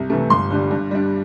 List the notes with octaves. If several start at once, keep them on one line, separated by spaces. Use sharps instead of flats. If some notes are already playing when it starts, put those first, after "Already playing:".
Already playing: C2
C3 E3 A3
G1 C6
G2 D3 G3
G2
G3 D4